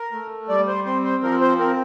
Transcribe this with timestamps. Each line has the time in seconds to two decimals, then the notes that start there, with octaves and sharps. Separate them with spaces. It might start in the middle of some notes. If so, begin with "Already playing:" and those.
Already playing: A#4
0.12 A3
0.49 G3 D5
0.67 C5
0.85 C4 C5
1.04 C5
1.23 F3 A#4
1.41 C5
1.59 C4 A#4